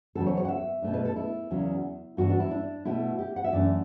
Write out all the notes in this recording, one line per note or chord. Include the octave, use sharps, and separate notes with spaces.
E2 C#3 F#3 A4
C#5
C#5
F#5
E5
B2 A3 D4
B4
A4
E4
E2 C#3 F#3 C#4
G2 E3 B3 D4 F#4
D4
E4
D4
B2 A3 D4 E4
G4
F#5
E5
F#2 E3 A3 D4 D5